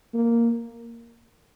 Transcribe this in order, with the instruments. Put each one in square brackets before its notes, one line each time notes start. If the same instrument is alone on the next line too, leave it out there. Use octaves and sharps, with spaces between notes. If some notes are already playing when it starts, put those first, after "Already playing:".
[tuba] A#3